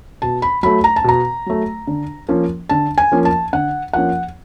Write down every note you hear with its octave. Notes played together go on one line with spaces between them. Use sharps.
B2 A5
B5
F#3 A3 B5
A#5
A5
B2 A#5
F#3 A3
D3
F3 A#3 C#4
D3 A5
G#5
F3 A#3 C#4
A5
D3 F#5
F3 A#3 C#4 F#5